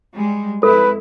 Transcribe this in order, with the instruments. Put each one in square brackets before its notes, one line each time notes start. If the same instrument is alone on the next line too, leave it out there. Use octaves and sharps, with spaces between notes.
[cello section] G3 G#3
[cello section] F2 G#3 E4 [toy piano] A4 [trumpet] B4